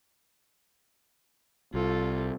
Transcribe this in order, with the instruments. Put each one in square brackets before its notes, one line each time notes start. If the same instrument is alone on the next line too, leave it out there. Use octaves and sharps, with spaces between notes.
[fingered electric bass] C2 [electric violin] F4 A4